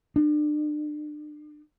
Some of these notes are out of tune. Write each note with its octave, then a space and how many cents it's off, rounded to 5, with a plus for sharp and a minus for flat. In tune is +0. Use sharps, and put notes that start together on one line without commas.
D4 +35